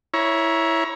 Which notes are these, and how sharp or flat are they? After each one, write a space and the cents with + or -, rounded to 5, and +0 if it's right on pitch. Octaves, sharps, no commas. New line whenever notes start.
E4 +0 C#5 +0 A#5 +30